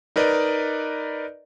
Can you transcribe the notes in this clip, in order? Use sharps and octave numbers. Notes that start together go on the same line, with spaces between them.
D#4 A#4 B4 D5 D#5